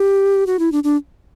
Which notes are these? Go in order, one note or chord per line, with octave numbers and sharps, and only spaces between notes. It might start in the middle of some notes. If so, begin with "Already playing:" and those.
Already playing: G4
F#4
E4
D4
D4